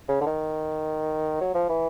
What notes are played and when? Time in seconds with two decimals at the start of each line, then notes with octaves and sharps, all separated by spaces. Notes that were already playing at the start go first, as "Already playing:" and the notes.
0.09 C#3
0.21 D3
0.26 D#3
1.41 F#3
1.55 F3
1.69 E3